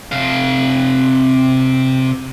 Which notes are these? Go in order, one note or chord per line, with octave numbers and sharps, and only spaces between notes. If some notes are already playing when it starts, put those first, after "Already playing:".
C3 F5